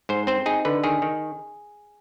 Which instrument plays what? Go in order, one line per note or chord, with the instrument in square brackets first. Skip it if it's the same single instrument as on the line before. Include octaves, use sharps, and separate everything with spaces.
[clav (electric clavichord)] G#2 C5
C4 C5
D#4 G#4
D3 B4
D#3 G#4
D#3